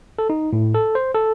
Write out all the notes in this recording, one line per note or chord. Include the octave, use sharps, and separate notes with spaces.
A4
D#4
A2
A4
C5
A4